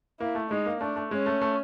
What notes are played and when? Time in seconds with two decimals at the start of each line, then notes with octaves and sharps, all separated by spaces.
0.20 A#3 E4
0.35 A3
0.51 G#3 D#4
0.66 A#3
0.81 A3 D4
0.96 A3
1.11 G#3 C#4
1.26 A3
1.41 A3